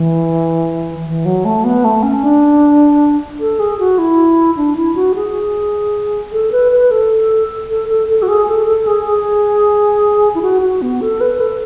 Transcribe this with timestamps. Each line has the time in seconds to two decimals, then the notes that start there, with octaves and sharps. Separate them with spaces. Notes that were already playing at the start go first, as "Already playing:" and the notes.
Already playing: E3
1.06 E3
1.25 F#3
1.45 A3
1.64 B3
1.84 A3
2.03 C#4
2.23 D4
3.40 A4
3.59 G#4
3.79 F#4
3.98 E4
4.57 D4
4.77 E4
4.95 F#4
5.15 G#4
6.32 A4
6.52 B4
6.72 B4
6.91 A4
7.70 A4
7.89 A4
8.08 A4
8.22 F#4
8.28 G#4
8.47 A4
8.67 A4
8.87 G#4
9.06 G#4
10.35 E4
10.42 F#4
10.62 F#4
10.82 B3
11.01 A4
11.21 B4
11.40 A4